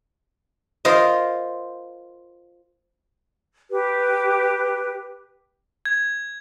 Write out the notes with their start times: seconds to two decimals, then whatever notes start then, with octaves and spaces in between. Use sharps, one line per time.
0.85 F4 A#4 C5 D#5
3.71 G4 B4
5.85 G#6